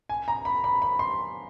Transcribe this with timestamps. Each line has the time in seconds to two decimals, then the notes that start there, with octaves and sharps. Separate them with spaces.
0.09 G#5
0.28 A#5
0.45 B5
0.64 B5
0.82 B5
0.99 C6